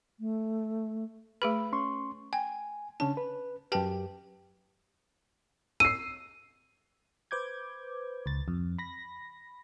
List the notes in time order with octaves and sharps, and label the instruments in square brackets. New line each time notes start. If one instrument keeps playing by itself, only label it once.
[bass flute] A3
[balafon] A3 G#4 B4 [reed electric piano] B5
[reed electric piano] C#4 C6 C#6
[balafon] G5 [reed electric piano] G#5
[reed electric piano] C#3 C#4 D4 [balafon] A5
[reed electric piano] B4
[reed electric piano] F#2 G4 [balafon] B4 G5 A5
[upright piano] E6 C7 [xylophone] D#7
[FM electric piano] B4 C5 D6 G6 G#6
C#2 A6
F2
B5 A#6